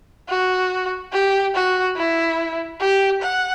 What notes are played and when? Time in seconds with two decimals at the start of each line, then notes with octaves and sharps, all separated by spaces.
0.29 F#4
1.12 G4
1.54 F#4
1.97 E4
2.80 G4
3.22 F#5